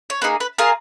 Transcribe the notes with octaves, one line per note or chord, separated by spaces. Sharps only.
C#5
A#3 D#4 G#4 B4
B4
A#3 F4 G#4 A#4